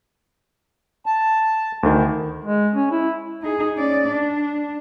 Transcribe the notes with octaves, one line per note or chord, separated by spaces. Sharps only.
A5
D2 D#3
G#3
C#4
E4
D#4 G#4
C#4 D5
D4